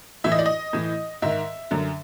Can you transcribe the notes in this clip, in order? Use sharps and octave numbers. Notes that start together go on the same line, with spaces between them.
A2 E3 E5
D#5
D5
D#5
A2 E3
G#2 D#3 E5
F#2 D3